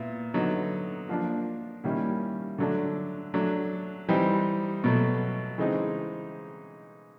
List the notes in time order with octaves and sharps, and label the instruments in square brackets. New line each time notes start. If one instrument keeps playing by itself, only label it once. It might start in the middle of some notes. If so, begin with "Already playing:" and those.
Already playing: [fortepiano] A#2 B3 E4
D3 F#3 B3 D#4
F3 A#3 D4
D#3 G3 A#3 C#4 E4
D3 F#3 A3 D4
F#3 A3 D4
E3 G3 C4 D#4
B2 F#3 A3
C#3 E3 G#3 C4 D#4